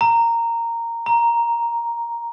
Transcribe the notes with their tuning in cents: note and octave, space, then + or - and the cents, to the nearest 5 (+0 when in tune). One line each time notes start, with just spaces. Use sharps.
A#5 -10
A#5 +5